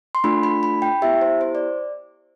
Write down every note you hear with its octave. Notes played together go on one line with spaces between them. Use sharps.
C6
A3 D4 F4 B5
B5
B5
G5
B3 E4 G4 E5
C5
C5
D5